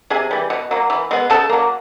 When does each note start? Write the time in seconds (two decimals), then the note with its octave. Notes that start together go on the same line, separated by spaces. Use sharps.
0.10 C3 G#4 G#5
0.31 E3 G3
0.50 B2
0.71 F#3 A#3
0.90 E3
1.11 G#3 B3
1.30 C#3 A4 A5
1.50 F#3 A#3